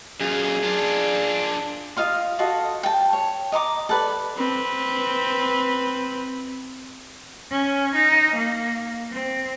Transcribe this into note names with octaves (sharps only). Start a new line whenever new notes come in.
F#2 F4 G#4
D4 F4
F4 D#5 F5 C6
F4 F#4 A4 D#5
G5 A5
C#5
D#5 A#5 C6 D6
A4 B4 D5
C4 B4
C#4
D#4
A#3
C4